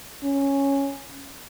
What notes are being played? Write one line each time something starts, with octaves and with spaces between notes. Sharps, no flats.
C#4